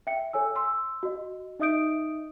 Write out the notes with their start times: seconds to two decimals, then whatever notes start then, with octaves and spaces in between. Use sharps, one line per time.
0.07 E5 G5 C#7
0.33 A4 C#5 G#5 E6
0.56 C6 E6
1.03 F#4 D#5
1.59 D#4 D#5 E5 D#6 G6 D7